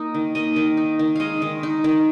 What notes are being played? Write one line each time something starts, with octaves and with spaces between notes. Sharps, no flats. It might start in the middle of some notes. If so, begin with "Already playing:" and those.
Already playing: A#3 D#4 A#4
D#3
A#3 D#5
D#3
D#4
D#3
G#3 D#5 F5
D#3
D#4
D#3